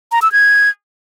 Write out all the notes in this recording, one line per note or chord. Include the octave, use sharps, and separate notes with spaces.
A#5
E6
G#6